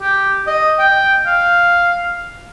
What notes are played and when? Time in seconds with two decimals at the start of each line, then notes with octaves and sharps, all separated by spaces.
0.01 G4
0.47 D#5
0.79 G5
1.26 F5